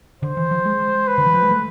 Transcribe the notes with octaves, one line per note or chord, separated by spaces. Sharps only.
D3 C5
E3
F3
G#3
B4
D3
E3
F3
G#3
A3